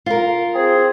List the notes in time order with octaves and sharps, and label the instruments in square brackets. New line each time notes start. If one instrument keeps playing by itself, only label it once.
[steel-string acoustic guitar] F4 A#4
[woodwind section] C4 G#4